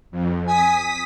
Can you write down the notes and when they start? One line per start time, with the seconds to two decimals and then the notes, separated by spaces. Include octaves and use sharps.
0.11 F2
0.47 G#5 D#6 B6